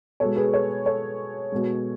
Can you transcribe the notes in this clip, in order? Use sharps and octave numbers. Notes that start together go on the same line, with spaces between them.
B2 G#3 A4 C#5
G#4 B4
A4 C#5
A4 C#5
B2 G#3